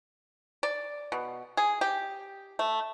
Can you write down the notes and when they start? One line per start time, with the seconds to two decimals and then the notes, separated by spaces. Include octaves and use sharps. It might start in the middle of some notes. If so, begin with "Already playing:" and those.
0.63 D5
1.12 B2
1.57 G#4
1.81 G4
2.59 A3